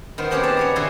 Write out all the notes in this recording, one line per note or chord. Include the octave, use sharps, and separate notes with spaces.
D#3 B3 C5
A#3 C4 C#4 G4 G#4 B4
B2 B4 C5 A5
B3 D#4 C#5
B2 D3 E3 G#4 G#5 C6